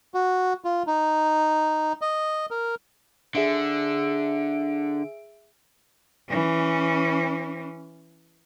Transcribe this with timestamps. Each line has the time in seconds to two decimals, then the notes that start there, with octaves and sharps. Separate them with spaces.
0.14 F#4
0.65 F4
0.87 D#4
2.01 D#5
2.51 A#4
3.35 D3 G#4 E5 D7
6.29 E3 C#4